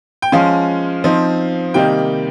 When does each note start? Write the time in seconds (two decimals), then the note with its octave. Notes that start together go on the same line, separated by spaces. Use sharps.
0.22 G5
0.32 F3 G#3 C#4 F5
1.04 F3 C4 D#4
1.74 C3 D#3 G3 A#3 D#4 G5